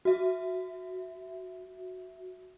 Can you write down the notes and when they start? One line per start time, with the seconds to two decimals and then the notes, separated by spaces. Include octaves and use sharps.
0.05 F#4 E5